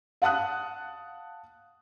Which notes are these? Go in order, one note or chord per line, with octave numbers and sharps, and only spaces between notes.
F5 F#5 A5 D#6 F#6